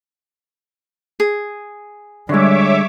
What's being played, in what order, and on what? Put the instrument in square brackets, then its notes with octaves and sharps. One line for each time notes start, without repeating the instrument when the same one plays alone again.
[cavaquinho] G#4
[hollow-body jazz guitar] D3 G#3 [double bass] G3 [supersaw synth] C#5 E5 D6